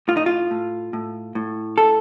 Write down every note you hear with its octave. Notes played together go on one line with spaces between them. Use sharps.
A2 F4
D#4
F4
A2
A2
A2
A4